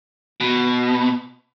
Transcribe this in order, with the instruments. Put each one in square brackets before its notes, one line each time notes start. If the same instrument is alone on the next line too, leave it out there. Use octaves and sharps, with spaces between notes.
[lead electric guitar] B2